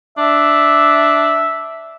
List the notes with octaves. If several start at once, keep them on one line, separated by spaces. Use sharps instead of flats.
D4 E5